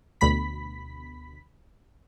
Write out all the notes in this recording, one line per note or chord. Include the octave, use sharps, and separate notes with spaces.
D2 B2 B5 B6